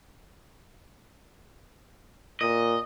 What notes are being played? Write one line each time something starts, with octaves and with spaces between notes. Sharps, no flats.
A#2 D#5